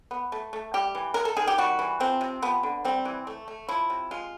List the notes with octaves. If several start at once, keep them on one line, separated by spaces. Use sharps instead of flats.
B3
A3
A3
G3 G4
E3
G#3 A#4
A4
D#3 G#4
G4
G3 F#4
E3
F3 C4
C3
F3 B3
D3
G3 C4
E3
A3
A3
F3 E4
C3
G#3 F4